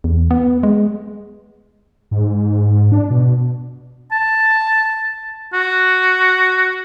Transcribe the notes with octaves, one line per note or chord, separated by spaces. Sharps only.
E2
B3
G#3
G#2
D4
B2
A5
F#4